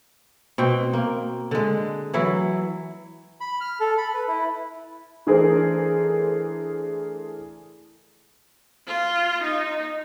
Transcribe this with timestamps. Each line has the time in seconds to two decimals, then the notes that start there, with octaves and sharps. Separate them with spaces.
0.58 B2 C4 G5
0.93 A#3
1.51 D3 G#3
2.14 E3 F#3 E4
3.41 B5
3.61 F6
3.80 A4
3.98 B5
4.14 B4
4.28 E4
5.27 E3 A3 D4 G#4 A#4 C5
8.87 F4
9.44 D#4